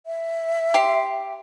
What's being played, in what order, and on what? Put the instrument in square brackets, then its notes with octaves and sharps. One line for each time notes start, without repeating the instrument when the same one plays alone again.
[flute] E5
[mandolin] G4 C6